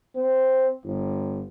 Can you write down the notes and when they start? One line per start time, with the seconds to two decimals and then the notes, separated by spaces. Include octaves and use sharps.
0.15 C4
0.84 G1